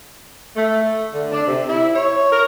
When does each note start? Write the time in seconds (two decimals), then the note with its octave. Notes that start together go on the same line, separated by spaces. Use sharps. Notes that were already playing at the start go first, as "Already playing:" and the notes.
0.56 A3
1.13 D3
1.32 D4
1.47 C3
1.68 E4
1.95 C#5
2.32 A#4